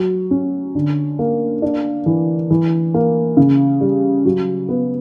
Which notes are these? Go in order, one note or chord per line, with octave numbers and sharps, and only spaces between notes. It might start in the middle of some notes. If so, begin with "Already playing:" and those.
Already playing: F#3
C#4
D3
A#3
D4
E3
E3
A#3
C#3
G3
F#3
B3